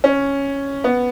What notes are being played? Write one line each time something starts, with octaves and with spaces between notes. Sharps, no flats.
C#4
B3